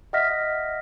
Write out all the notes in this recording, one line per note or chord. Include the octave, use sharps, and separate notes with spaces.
D#5 E5 F#5 F6 A#6 B6